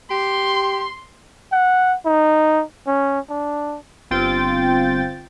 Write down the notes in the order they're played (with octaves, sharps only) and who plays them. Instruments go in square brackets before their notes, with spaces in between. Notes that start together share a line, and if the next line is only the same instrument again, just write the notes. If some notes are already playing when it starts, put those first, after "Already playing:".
[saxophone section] G4 [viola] C6
[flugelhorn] F#5
D#4
C#4
D4
[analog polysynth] G1 C4 F4 G5 A6